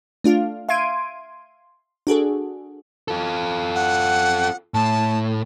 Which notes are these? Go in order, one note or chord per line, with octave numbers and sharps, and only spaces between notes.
A3 D4 F4 F5
E5 F5 C6 G#6 D7 D#7
D4 F#4 G#4 A4
F4 A4
F#5
A2 A5